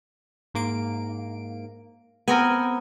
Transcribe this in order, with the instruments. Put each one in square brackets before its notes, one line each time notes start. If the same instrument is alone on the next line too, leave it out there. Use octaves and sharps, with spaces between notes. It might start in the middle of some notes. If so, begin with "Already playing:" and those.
[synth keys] G#2 A#3 D7
[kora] B3 C4 A#4 [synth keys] G5 G#5